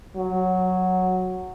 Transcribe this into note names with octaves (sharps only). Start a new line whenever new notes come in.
F#3